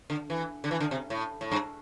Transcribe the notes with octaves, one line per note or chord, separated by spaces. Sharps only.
D3
E3
D3
E3
D3
C3
A2
A2
G2